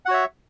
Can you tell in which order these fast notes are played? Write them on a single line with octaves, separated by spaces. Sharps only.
F#5 F#4 C#5 E5